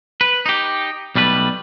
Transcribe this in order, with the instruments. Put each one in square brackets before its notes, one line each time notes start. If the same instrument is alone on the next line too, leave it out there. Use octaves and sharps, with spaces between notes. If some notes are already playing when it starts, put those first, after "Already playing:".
[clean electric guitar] B4
D#4 G4
B1 G3 A3 B4